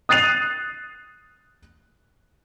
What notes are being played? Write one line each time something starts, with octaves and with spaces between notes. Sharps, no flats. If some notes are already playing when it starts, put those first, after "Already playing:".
D#6 F#6 A6 C7 D#7 F7